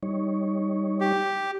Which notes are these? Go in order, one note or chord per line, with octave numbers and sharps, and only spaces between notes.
G3 D#4 C#5
G4